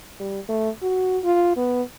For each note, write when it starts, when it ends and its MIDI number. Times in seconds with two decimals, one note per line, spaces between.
0.20 0.39 55
0.49 0.69 57
0.82 1.18 66
1.24 1.54 65
1.57 1.82 59